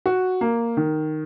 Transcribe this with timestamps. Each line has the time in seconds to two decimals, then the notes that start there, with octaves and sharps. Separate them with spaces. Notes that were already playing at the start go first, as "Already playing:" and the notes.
0.06 F#4
0.41 A#3
0.77 D#3